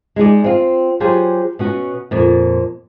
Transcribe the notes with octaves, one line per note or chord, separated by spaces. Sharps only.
G#3 D#4 G#4 D5
C4 F4
F#3 F4 G4 G#4 C5
B2 C#4 F#4
F2 A#2